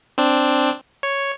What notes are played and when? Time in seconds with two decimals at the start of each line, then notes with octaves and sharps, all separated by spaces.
0.18 C4 D4
1.03 C#5